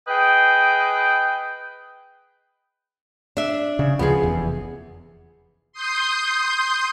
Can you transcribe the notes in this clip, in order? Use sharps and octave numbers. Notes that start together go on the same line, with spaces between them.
G#4 B4 D#5 G5
D4 E5
C#3
D2 C#3 F3 B3 G#4
F1 E2
C6 D#6 G6